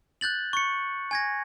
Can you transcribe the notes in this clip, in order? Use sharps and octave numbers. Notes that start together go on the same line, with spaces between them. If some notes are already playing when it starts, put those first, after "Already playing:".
F#6 G6 A6 F#7
C#6 C#7
G#5 G#6 A#6